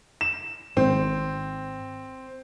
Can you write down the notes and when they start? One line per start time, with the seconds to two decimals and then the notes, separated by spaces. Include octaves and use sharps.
0.21 E7
0.77 G#1 C4